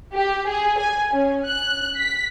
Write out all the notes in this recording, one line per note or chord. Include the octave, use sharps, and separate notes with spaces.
G4
G#4
G#5
C#4
F#6
B6